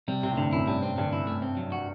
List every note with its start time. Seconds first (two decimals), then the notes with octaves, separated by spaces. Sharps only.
0.08 C3 G3
0.23 C3 C4
0.32 A2
0.37 G2 D3
0.53 F#2 E4
0.67 G2 G3
0.83 C4
0.98 G2 D3
1.13 E4
1.27 A3
1.42 C4
1.57 F#3
1.72 F#4